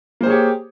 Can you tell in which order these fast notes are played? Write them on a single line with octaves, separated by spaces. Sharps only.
A#3 C5 G#4 C#5 G4